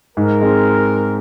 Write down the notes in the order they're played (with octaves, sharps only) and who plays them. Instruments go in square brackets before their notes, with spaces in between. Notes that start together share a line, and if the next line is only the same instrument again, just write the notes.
[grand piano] G#2 [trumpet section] A#4
[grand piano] G#3 C4